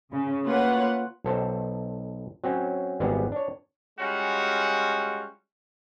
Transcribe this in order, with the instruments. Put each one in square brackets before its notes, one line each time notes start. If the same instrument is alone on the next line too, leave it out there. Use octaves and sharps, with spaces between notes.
[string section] C#3
A3 A#3 F4 B4 C#5 F#5
[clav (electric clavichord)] B1 A4 C5
F#3 C4 C#4
G#1 G3 B3 C4 G#4 F#5
D4 C#5
[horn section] G3 G#3 C#4 F4 F#4